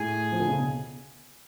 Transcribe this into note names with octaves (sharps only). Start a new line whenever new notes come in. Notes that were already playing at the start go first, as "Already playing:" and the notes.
Already playing: A2 G#4 G#5
F3
D3
C#3
B2